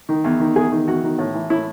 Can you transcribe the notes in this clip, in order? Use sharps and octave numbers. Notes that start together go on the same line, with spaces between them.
D#3
E2
D#3
E2 G#4
D#3
E2 F#4
D#3
A2
E3
A2 E4